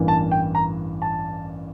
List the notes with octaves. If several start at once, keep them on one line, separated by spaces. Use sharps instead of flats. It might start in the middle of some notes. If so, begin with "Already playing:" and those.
Already playing: A1 G2 E3 A#3
A5
G5
A#5
A5